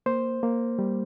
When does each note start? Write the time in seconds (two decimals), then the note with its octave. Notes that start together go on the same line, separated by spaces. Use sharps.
0.06 A#3 C5
0.43 A#3
0.79 G3